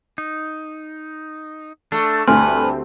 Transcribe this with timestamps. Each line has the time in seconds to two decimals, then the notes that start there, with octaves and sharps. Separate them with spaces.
0.18 D#4
1.92 A3 D4
2.27 D2 G2 A3 C4 B4 G#5 C6 F6